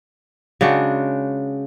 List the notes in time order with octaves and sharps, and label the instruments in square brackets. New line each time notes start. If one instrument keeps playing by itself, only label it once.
[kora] C#3 G#3 D4 F#4